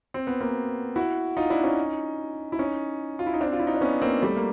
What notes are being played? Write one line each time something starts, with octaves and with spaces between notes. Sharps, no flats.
C4
B3
A#3 C4
E4 F#4
D#4 F4
D4 E4
C#4 D#4
E4
C#4 D#4
F4
E4
D#4
C4 D4
F4
E4
D#4
D4
B3 C#4
A#3 C4
G3 A3
A#3